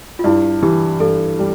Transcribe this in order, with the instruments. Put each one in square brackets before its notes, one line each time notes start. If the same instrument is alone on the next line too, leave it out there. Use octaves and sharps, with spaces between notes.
[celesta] F4
[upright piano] G2 [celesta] E4
[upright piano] E3 [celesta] G4
[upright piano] G2 [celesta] A4
[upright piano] G3